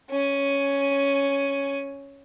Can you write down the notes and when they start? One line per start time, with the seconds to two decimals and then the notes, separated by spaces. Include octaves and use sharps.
0.10 C#4 G#5